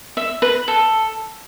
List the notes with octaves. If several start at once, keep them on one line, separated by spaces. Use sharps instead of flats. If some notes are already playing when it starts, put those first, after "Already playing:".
E5
B4
A4